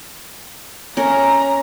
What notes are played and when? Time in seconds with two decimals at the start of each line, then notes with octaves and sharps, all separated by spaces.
0.97 C#4 A#4 A#5